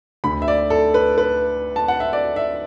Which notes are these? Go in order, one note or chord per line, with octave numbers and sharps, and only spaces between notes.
D2 D3 B5
E5
D5
A4
B4
B4
A5
F#5
E5
D5
E5